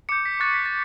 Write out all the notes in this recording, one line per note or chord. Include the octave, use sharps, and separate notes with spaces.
D6 G6 C#7
B6
C#6 F#6 A6
B6
A6